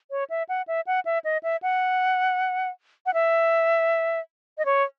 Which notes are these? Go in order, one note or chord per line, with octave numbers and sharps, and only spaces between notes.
C#5
E5
F#5
E5
F#5
E5
D#5
E5
F#5
F#5
E5
D#5
C#5